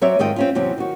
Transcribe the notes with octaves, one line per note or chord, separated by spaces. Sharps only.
F#3 C4 C#5 D5 E5
G#2 D#3 F4 D#5 G5
C4 C#4 F4
E2 C3 F#3 C4 G4
D#3 F#4